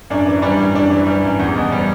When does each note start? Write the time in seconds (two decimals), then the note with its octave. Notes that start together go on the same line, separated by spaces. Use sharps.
0.10 F#2 D4
0.27 E3
0.42 G3 D4
0.59 F#2
0.75 F#2 D4
0.92 E3
1.07 G3
1.24 F#2
1.40 E2
1.56 B2
1.72 G3